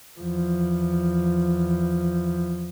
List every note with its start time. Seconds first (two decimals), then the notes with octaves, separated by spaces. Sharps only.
0.19 E2 F3